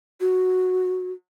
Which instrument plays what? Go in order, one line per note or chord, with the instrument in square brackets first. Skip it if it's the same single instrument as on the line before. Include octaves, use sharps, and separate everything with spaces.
[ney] F#4